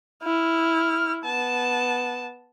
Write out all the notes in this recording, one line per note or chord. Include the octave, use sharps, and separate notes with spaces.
E4 F6
B3 A5